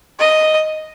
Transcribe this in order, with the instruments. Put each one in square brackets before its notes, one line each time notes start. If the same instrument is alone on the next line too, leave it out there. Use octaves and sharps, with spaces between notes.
[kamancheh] D#5